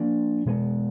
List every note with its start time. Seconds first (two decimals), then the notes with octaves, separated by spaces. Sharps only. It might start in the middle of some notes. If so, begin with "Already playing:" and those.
Already playing: F3 A#3 D4
0.46 B2 G#3 B3